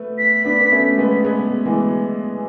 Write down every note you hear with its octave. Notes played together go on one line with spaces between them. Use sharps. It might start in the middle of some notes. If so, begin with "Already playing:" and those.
Already playing: A3 B3
B6
B3 D4
B3
A3 C#4
G#3 B3
G#3 B3
E3 G#3